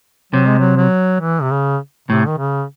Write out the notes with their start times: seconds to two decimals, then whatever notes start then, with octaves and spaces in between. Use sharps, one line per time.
0.32 C3 F#3
0.46 G#3
0.59 F#3
0.77 F#3
1.21 E3
1.42 C3
1.51 C#3
2.08 A2 C3
2.27 D#3
2.38 C#3